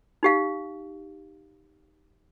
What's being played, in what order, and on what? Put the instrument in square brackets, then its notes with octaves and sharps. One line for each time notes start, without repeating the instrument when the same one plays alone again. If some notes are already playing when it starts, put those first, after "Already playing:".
[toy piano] D#4 G4 F5